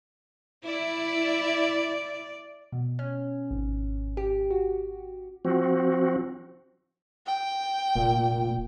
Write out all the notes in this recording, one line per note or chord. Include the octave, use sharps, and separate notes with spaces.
E4 D5
B2
C#4
G#1
G4
F#4
F3 C4 F#4
G5
F1 A#2